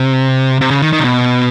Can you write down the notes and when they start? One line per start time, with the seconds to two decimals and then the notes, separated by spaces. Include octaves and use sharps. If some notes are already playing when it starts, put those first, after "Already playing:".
Already playing: C3
0.61 C3
0.70 C#3
0.82 D#3
0.93 D#3
0.99 C3
1.04 B2